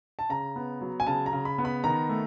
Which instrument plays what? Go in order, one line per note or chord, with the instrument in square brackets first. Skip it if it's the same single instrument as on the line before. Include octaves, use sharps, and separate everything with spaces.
[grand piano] A5
C#3 A#5
B3
F#3
G#5
C#3 A5
A#5
C#3
B5
B3
B5
D#3 A#5
A3